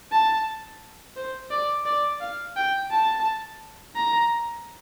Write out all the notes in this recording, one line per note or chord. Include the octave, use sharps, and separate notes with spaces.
A5
C5
D5
D5
F5
G5
A5
A#5